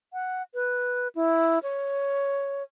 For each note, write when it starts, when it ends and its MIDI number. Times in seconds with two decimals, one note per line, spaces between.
0.13 0.43 78
0.54 1.08 71
1.15 1.59 64
1.63 2.63 73